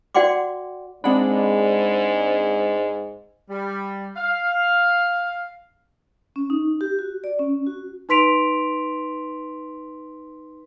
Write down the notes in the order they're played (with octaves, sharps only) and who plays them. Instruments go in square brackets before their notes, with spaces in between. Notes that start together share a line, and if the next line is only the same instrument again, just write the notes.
[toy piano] F#4 D5 F#5 G5 C6 D6
[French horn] G#2 [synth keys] G#3 D4 [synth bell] C4 F#5 B5
[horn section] G3
F5
[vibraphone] C#4
D#4
G4
F#4
D5
C#4
F#4
[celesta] D#4 B4 C6 B6 D7 F7